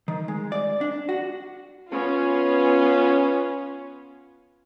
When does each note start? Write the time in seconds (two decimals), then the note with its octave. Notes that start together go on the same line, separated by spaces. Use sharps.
0.08 D#3
0.28 G#3
0.52 D5
0.81 D4
1.09 F#4
1.88 B3 C#4 F4